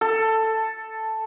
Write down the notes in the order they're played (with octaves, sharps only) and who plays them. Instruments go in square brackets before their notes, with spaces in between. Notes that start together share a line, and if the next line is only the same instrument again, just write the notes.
[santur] A4